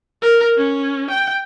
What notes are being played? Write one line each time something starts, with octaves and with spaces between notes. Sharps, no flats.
A#4
C#4
G5